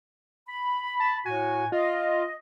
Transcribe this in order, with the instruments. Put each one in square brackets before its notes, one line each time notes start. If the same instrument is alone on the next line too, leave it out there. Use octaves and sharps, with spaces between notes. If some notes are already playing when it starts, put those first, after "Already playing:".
[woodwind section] B5
[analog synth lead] A5
[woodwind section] A2 F#4 [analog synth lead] G#5
[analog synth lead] F4 [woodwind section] D#5